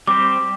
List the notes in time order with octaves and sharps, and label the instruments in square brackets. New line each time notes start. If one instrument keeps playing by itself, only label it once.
[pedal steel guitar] G3 C4 G4 C5 [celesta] D6